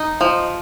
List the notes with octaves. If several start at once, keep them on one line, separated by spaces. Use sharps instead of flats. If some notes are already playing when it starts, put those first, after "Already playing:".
Already playing: D#4
F3